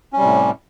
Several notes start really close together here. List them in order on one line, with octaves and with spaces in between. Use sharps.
C#4 G3 C3 A2